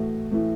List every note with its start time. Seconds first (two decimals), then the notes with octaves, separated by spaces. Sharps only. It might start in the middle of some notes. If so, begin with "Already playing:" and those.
Already playing: A2 E3 A3 F#4
0.31 A2 E3 A3